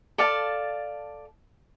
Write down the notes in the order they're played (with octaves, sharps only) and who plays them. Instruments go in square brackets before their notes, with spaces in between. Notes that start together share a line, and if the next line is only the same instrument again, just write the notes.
[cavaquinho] A4 D5 F5 A5